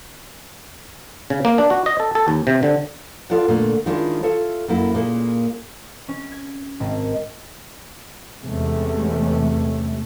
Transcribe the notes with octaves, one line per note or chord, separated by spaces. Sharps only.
C#3
A#3
D4
F#4
D#5
A4
A4
D#2
C3
D3
F4 A4 D5 F#5
A#2 D3 A3
D#3 G#3 C#4 D4 E4 F4
F4 A4 C#5 E5
F#2 A#3 E4
A#2 G#3 A#3 C#4
C#4
G#6
G#1
E2 C3 G#3 A3 C#4